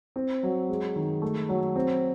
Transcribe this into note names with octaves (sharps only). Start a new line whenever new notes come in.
C4
F#3
G#3
D#3
A3
F#3
C4